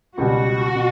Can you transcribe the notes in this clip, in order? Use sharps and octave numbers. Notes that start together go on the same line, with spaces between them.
C#2 B2 G3 F#4
B2